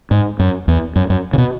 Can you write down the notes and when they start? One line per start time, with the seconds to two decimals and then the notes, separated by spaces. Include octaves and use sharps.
0.11 G#2
0.39 F#2
0.68 E2
0.96 F#2
1.10 F#2
1.33 C#3
1.38 B2